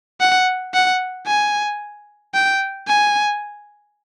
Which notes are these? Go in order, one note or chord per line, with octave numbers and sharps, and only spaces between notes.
F#5
F#5
G#5
G5
G#5